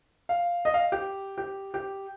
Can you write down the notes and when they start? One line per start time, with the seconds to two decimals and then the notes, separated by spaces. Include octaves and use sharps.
0.29 F5
0.65 D#5
0.74 F5
0.92 G4
1.38 G4
1.74 G4